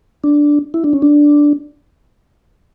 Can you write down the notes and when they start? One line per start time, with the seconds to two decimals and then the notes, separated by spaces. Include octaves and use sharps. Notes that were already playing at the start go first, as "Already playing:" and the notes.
0.24 D4
0.74 E4
0.84 D4
0.93 C#4
1.02 D4